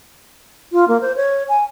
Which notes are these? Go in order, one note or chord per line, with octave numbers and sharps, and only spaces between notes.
F4
A#3
C5
C#5
G#5